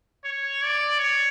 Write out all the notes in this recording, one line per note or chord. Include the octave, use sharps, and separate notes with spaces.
C#5
D5
C#5